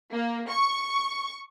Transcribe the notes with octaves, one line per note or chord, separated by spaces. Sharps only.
A#3
C#6